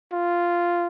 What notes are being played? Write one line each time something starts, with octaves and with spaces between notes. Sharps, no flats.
F4